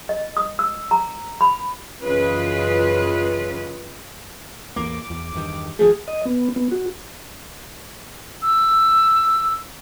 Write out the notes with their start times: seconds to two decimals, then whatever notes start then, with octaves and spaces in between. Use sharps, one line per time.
0.09 D#5
0.37 D#6
0.59 E6
0.91 A#5
1.41 B5
2.01 F#2 C#3 E3 F4 B4 D#5
4.76 A1 E2 A#3 D6
5.10 E2
5.35 E2 G2 D#3
5.79 G#1 F3 A3 G#4
6.08 D#5
6.25 B3
6.56 B3
6.71 F#4
8.42 E6